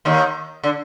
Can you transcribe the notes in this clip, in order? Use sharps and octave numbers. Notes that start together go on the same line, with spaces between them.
D#2 D#3
D3